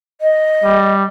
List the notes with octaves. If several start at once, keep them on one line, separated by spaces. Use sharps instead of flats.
D#5
G3